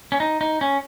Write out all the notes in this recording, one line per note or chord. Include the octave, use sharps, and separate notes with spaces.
C#4
D#4
D#4
C#4